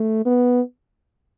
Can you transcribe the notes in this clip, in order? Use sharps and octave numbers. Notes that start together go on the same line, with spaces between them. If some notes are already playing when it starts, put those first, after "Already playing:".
Already playing: A3
B3